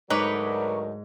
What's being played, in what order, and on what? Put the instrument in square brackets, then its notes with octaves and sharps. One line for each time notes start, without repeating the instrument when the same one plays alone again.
[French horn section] D2 F#3 A#4 [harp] G#2 [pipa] D#4 [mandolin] B4 C#5 D5